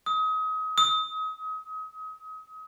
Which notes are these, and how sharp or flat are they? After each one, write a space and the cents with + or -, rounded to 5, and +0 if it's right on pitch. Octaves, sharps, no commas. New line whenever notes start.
D#6 +30
D#6 +35